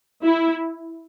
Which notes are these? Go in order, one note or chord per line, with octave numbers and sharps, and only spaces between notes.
E4